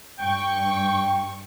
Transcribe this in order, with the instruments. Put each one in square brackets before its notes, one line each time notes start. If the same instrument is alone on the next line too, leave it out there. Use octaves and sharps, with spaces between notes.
[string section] G2 C#6 [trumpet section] G5